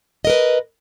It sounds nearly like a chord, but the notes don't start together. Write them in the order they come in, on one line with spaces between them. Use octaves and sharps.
D#5 A#4 B4